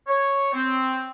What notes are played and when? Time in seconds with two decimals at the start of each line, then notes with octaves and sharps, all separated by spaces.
0.08 C#5
0.53 C4